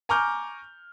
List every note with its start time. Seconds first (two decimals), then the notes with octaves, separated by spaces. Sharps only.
0.09 G#5 A#5 C#6 D6 F6 G6